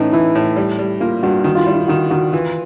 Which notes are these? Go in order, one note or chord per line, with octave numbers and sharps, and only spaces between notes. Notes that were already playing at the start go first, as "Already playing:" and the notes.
Already playing: A2 E3 C#4 D#4
E3 E4
A2
G3
G3
A#3 F4
G2 F#4
D#3 F#4
F4
G3 E4
F4
D#3 F#4
D#3 F#4
E3 F4